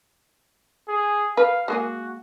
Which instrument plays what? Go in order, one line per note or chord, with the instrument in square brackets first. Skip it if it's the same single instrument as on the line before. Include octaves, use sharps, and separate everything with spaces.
[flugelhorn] G#4
[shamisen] B4 [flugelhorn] F5
[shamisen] G#3 A#3 G#4 [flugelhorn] F#4